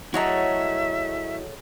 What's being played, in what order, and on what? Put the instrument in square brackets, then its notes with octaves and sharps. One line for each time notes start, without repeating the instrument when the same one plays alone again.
[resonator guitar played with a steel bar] F#3 [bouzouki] A3 G#4 C#5 [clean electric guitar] E4 D#5 A#5 [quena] E5